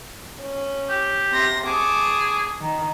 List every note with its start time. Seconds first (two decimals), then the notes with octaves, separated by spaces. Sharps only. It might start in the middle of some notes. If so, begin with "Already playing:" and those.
0.41 C#4
0.90 G4
1.31 C3 C6 A#6
1.67 G#4 A5 C#6 D6
2.60 D#3